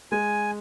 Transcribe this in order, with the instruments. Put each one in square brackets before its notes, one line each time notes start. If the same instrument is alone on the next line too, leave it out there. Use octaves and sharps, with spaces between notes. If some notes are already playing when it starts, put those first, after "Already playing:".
[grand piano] G#3 [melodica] G#5